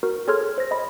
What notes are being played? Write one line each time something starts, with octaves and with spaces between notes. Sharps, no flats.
F#4 A#4
G#4 A4 C#5 C6 F6 G#6
C5 A#6
D#5 B5